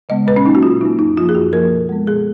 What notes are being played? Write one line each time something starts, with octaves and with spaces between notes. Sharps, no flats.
C#3 G#3 B3 D#5
A#2 B4
C#4
F#3 A#3 D#4
F#4
A#2 F4
F#3 A#3 D#4
F#2 D#4
F3 A#3 F4
G#4
F#2 F#4
F3 A#3 A#4
B2
G#3 B3
B2 G#4